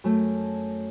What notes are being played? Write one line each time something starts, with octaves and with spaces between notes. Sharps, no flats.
F#2 A3